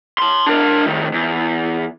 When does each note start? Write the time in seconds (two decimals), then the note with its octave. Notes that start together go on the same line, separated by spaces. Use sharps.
0.18 A5 C6
0.46 D4 A#4
0.86 A2 D#3
1.14 E2